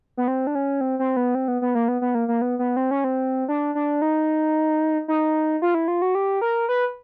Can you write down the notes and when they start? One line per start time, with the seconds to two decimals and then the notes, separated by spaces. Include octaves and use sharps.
0.17 B3
0.28 C4
0.47 D4
0.55 C#4
0.81 C4
0.99 C4
1.17 B3
1.35 C4
1.48 B3
1.62 B3
1.75 A#3
1.88 B3
2.01 B3
2.15 A#3
2.28 A#3
2.41 B3
2.59 B3
2.77 C4
2.91 C#4
3.04 C4
3.48 D4
3.75 D4
4.02 D#4
5.08 D#4
5.62 F4
5.74 E4
5.88 F4
6.02 F#4
6.15 G4
6.41 A#4
6.69 B4